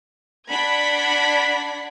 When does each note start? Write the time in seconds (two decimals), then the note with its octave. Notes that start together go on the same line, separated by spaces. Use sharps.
0.50 D4 F#5 B5 G#6 B6